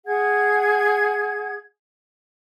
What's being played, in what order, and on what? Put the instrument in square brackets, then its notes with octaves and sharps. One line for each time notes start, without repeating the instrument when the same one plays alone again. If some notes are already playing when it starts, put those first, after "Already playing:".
[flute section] G#4 F#5 G#6